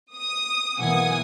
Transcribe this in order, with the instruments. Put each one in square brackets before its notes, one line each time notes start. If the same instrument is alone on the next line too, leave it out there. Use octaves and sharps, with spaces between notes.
[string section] D#6
[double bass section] B1 E3 A#3 [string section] F#5 G#5 D#6